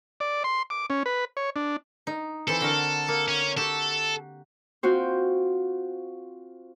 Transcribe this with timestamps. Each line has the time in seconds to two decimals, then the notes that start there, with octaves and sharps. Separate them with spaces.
0.20 D5
0.44 C6
0.70 D6
0.90 C#4
1.06 B4
1.37 C#5
1.56 D4
2.07 D#4
2.48 E3 C4 A4
2.61 D3 F#4 A#4
3.08 A#3
3.28 C#4
3.57 F#4 G4 A4
4.83 C4 F4 F#4 C5